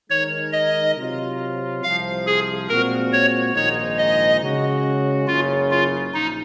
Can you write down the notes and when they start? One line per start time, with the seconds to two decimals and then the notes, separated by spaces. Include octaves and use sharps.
0.10 D#3 G#3 D#4 A#4 C#5
0.53 D#5
0.97 C3 F#3 C4 F4
1.83 C2 C3 F3 F5
2.27 G#4
2.69 A#2 G#3 C4 F#4 A#4
3.13 C#5
3.55 A#1 G#2 D#3 G#3 D#4 C#5
3.98 D#5
4.42 C#3 G#3 C#4 F#4
5.27 F#1 F#2 C#3 F4
5.71 F4
6.14 A#1 D#4